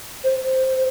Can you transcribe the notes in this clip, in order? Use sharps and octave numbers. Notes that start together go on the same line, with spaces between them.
C5